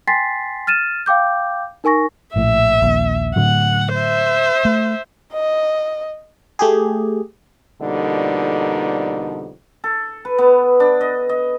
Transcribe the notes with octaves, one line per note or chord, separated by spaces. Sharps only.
G5 G#5 C6 A6 B6 C7
F6 A6 D#7 E7
F5 G5 D6 G6
D#4 A#4 G#5 C#6 A#6
A#1 A2 E5
A#1 D#2
A2 D3 F#3 F#5
C5 E5
A3
D#5
A3 G4 G#4
F2 B2 D3 G3 A#3 D#4
A4
B4
B3
D4
D#5
D#5